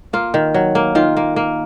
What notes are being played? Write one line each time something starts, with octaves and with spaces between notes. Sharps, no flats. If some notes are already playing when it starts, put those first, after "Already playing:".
A#3 F4
D#3
F#3
A#3
D#3 F4
A#3
A#3